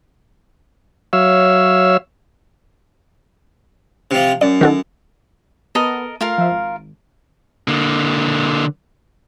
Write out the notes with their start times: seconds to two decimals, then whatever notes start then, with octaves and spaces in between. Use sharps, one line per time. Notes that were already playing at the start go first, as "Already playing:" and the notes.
1.13 F#3 C#5 E5 F5 E6
4.11 C3 F3
4.41 F#2 D5
4.61 D#3 F#4 A4
5.75 B3 A4 A#4 D#5
6.21 A3 F4 A#4 F5
6.38 F3 E5
6.52 G#1
7.68 D3 A#3